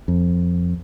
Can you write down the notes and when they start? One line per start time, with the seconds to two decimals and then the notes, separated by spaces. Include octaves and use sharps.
0.08 F2